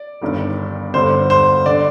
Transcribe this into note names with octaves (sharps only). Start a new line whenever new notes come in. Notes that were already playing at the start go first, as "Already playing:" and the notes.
Already playing: D5
G1 G2 D#3 G3
G1 G2 D3 G3 C5
C5
D3 D5